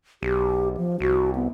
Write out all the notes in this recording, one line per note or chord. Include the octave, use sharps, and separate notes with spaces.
B1 G4
F3
C2 F#4
B3